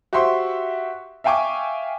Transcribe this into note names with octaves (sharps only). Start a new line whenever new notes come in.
F#4 G4 C5 E5 C6 C#6
E5 F5 G5 G#5 C#6 D6